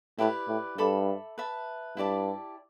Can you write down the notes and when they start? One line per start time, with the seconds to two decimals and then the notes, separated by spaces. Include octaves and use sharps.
0.19 A2 E4 G4 B4 D5
0.48 A2
0.78 G2 A4 E5 B5 D6
1.38 B4 E5 A5
1.97 G2 E4 G4 D5 A5